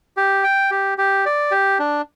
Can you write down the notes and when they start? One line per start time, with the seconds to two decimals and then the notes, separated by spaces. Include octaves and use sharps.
0.17 G4
0.44 G5
0.71 G4
0.98 G4
1.26 D5
1.51 G4
1.79 D4